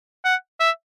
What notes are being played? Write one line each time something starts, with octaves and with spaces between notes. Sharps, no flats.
F#5
E5